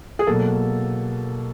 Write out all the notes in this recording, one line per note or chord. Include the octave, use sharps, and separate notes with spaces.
G#4
B2 F#3 A#3 A4